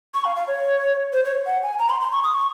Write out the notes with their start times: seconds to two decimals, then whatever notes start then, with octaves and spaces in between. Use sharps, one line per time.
0.14 C#6
0.25 F5
0.36 F5
0.48 C#5
1.13 C5
1.25 C#5
1.46 F#5
1.63 G#5
1.79 A#5
1.90 C6
2.01 C6
2.12 C#6
2.24 D#6
2.34 C#6